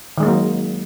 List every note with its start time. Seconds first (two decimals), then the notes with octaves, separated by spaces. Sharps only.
0.18 D#3
0.20 G#3
0.23 D#4
0.25 A#3
0.28 F#3